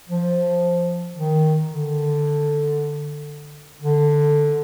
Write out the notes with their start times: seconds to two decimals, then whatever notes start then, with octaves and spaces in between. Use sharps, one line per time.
0.09 F3
1.16 D#3
1.69 D3
3.82 D3